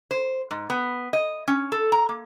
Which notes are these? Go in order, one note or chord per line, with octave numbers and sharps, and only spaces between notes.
C5
G#2
B3
D#5
C#4
A4
A#5
A#3